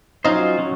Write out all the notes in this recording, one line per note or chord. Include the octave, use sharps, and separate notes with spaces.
F#3 C#4 D#4 F4 C5 D#5
F#3 C#4